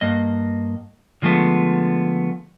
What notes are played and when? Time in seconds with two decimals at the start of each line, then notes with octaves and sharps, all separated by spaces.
0.01 G2 A#3 D#5
1.22 D3 F3 G#3 A3 B3